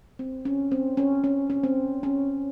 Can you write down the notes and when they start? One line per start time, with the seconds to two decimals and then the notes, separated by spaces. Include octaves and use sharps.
0.19 C4
0.45 C#4
0.71 C4
0.97 C#4
1.24 C#4
1.50 C#4
1.64 C4
2.03 C#4